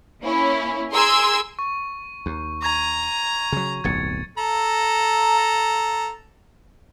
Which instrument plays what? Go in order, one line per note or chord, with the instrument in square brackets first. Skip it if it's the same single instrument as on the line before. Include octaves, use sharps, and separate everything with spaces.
[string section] A#3 C#4 E4
G#4 A#4 C6 E6 G#6
[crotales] C#6
[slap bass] D#2
[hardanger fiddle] A#5 [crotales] C#6 G#6
[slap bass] C#3 F#3
[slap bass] D1 B1 F2 [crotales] G#6 A6 C#7
[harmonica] A4 A#5